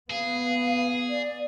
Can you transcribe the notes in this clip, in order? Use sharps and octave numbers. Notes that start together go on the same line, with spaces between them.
B3 G#4 F5
D5